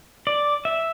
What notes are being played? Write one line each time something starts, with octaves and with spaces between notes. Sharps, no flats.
D5
E5